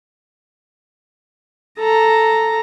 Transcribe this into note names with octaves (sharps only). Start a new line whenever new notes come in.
A4 A#5